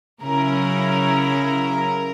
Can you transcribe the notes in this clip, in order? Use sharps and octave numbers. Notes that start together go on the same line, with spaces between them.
C#3 F#3 C#4 E4 A#4